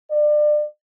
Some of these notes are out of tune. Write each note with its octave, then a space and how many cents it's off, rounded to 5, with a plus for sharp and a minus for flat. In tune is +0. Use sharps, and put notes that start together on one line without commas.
D5 +30